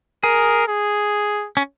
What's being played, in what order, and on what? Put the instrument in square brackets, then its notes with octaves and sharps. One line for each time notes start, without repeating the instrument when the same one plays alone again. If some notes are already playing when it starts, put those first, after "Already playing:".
[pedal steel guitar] G#4 [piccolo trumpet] A#4
[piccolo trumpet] G#4
[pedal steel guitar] C#4